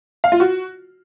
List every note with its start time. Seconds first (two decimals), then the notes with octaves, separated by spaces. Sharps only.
0.24 F5
0.32 F4
0.40 F#4